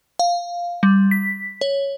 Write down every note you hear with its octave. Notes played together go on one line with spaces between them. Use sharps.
F5
G3
B6
C#5